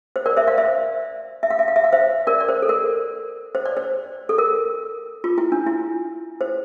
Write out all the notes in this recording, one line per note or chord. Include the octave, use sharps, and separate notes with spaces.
C5
A#4 D5
C5 E5
D5 F5
C5 E5
E5
F5
E5
F5
E5
F5
C5 E5
A#4 D5
D5
C5
A4
A#4
C5
D5
C5
A4
A#4
F4
E4
D4
E4
C5